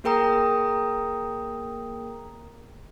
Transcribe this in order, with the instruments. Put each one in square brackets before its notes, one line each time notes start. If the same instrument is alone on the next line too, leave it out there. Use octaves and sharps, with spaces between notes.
[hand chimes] A#3 G#4 A#4 G5 A#5 D#6